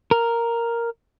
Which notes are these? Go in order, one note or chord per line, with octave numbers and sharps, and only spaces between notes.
A#4